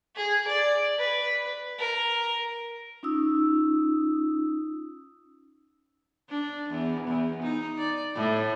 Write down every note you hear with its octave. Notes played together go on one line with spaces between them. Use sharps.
G#4
D5
B4
A#4
C#4 D#4 F4 D#6 E6
D4
E2
E2
D#4
D5
A2